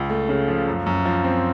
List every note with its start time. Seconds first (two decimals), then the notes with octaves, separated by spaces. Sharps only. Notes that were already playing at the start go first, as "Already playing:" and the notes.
Already playing: C#2
0.09 A3
0.29 C#3
0.48 F3
0.67 F#2
0.86 F#2
1.06 F3
1.24 C4